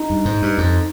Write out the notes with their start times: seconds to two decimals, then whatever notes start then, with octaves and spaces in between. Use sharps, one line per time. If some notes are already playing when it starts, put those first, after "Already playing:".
Already playing: D#4
0.10 G2
0.25 G#2
0.42 G2
0.58 F2